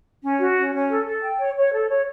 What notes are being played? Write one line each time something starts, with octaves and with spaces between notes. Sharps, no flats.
C#4
F#4
C#4
C#4
A4
A4
G5
C#5
C#5
A4
C#5